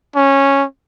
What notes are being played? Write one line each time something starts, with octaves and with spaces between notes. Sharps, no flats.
C#4